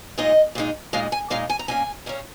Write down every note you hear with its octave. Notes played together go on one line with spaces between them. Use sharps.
A#2 G#3 D#4 D#5
A#2 G#3 D#4
A#2 G#3 D#4 F5
G#5
A#2 G#3 D#4 F5
G#5
A#5
A#2 A#3 C#4 G#5
A#2 A#3 C#4